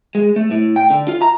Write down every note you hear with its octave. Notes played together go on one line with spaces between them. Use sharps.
G#3
A3
A2
G5
D3
F4
A#5